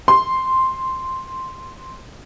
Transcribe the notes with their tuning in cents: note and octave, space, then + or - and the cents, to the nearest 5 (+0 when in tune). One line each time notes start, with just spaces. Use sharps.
C6 +0